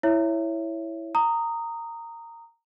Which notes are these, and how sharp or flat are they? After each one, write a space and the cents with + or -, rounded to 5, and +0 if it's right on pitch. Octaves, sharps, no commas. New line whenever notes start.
E4 +0 C#5 +0 E5 +10
A#5 -15 D#6 +0